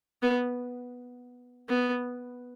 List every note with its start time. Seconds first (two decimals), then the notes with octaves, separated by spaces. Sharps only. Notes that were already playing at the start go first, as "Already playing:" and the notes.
0.22 B3
1.69 B3